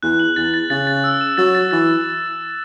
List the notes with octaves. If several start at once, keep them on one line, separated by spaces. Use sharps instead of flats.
E2 F#6
F#7
E2 A6
A6
C#3 A6
A6
E6
E7
F#3 A6
A6
E3 A6